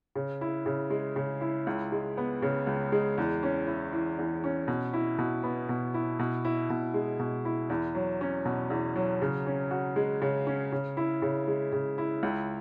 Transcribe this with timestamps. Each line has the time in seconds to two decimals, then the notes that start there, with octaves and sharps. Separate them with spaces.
0.15 C#3
0.41 E4
0.66 C#3
0.90 G#3
1.16 C#3
1.41 E4
1.67 C#2
1.92 G#3
2.17 B3
2.42 C#3
2.67 C#2
2.92 G#3
3.18 E2
3.43 C#4
3.67 E4
3.93 E3
4.18 E2
4.44 C#4
4.68 B2
4.93 E4
5.19 B2
5.44 B3
5.69 B2
5.94 E4
6.20 B2
6.45 E4
6.70 B2
6.94 G#3
7.20 B2
7.45 E4
7.70 E2
7.95 F#3
8.21 C#4
8.45 B2
8.70 E2
8.96 F#3
9.22 C#3
9.46 C#4
9.71 F#4
9.96 G#3
10.22 C#3
10.47 C#4
10.72 C#3
10.97 E4
11.22 C#3
11.48 G#3
11.73 C#3
11.98 E4
12.23 C#2